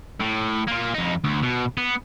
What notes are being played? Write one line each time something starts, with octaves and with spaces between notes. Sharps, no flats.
A2
A#3 F4
F2 D#4
D2
B2
B3